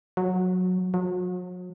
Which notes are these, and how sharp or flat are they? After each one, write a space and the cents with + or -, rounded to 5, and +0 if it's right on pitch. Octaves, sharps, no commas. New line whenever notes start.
F#3 -15
F#3 -40